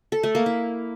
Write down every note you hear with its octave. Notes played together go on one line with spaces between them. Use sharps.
A4
A3
A#3
E4